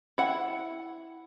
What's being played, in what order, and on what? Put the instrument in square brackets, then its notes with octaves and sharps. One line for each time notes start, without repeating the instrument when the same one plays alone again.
[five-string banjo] E4 F#5